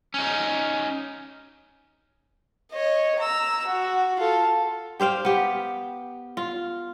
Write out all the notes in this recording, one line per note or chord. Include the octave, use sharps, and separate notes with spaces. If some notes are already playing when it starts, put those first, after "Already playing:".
C#4 D#4
C#5 D#5
A#5 E6
F#4
F4 A4
G4 C5 F5 G5
B3 G4
F4